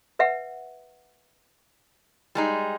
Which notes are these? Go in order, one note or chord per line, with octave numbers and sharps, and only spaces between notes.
B4 E5 F#5
G3 G#3 D#4